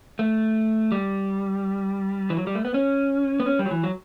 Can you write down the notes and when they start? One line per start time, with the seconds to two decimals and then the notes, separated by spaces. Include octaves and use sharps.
0.19 A3
0.92 G3
2.30 E3
2.37 F#3
2.47 G3
2.55 A3
2.65 B3
2.74 C#4
3.40 B3
3.46 C#4
3.59 G3
3.65 F#3
3.71 E3
3.83 F#3